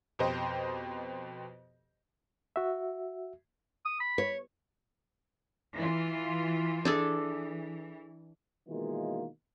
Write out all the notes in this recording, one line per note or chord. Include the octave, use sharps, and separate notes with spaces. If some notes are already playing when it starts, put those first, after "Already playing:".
F2 B2 G4 C5 D#5
F#4 E5
D#6
B5
C#5
E3 F4
E3 D4 G#4 A4
B2 D#3 E3 G#3 A#3 F4